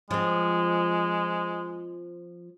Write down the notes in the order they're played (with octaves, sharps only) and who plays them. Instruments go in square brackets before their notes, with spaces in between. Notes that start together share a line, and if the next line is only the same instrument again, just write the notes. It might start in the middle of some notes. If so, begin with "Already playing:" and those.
[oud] F3 C4 [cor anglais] G#3